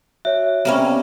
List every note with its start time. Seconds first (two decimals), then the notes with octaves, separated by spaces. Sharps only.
0.25 F#4 C#5 E5
0.65 C3 G3 A#3 B3 C#4